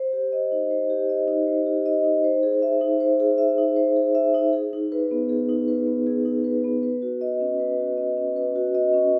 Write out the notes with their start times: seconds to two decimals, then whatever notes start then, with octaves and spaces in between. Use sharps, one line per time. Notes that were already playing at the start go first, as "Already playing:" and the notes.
Already playing: C5
0.13 G4
0.32 D#5
0.52 D#4
0.71 C5
0.90 G4
1.09 D#5
1.28 D#4
1.47 C5
1.66 G4
1.86 D#5
2.04 D#4
2.24 C5
2.43 G#4
2.62 E5
2.81 D#4
3.00 C5
3.20 G#4
3.38 E5
3.58 D#4
3.76 C5
3.96 G#4
4.15 E5
4.34 D#4
4.53 G#4
4.73 D#4
4.92 B4
5.11 B3
5.29 G#4
5.49 D#4
5.68 B4
5.87 B3
6.07 G#4
6.25 D#4
6.44 B4
6.64 B3
6.83 B4
7.02 F#4
7.21 D#5
7.41 C#4
7.60 B4
7.79 F#4
7.97 D#5
8.17 C#4
8.36 B4
8.55 F#4
8.75 D#5
8.94 C#4